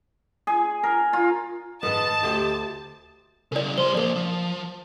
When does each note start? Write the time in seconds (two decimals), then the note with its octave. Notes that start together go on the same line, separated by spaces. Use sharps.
0.47 G#4
0.83 A#4
1.13 F4
1.83 G#2 D3 B4 D#5 A5
2.23 D2 G#3 G4 C5
3.52 C#3 E4 A#4 D5
3.78 G3 C5 C6
3.94 F3 A#3 A#4 D5
4.16 F3